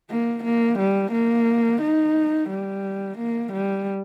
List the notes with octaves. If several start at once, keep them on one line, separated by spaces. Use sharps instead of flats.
A#3
A#3
G3
A#3
D#4
G3
A#3
G3